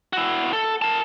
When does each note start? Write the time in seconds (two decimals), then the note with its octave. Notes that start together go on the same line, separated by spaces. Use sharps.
0.13 E4 F#4
0.53 A4
0.82 A#4 A5